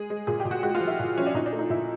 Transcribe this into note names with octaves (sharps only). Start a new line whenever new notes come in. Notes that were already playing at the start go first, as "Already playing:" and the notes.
Already playing: G#3 G#4
G#3
A#2 G#4
G4
A#2
F#4
G#3 F#4
F4
F3
E4
A#2
F3 C#4
D4
A#2 D#4
D4
A3
D#4
A#2 E4